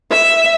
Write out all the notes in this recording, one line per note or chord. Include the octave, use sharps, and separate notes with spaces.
E5